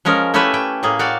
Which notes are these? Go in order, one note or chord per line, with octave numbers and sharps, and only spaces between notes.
F3 G#3 C#4 A#4
A3 C#4 E4 G4 B4 E5
E4 G5
A2 A#3 G#4
F#4 D5 F5 G5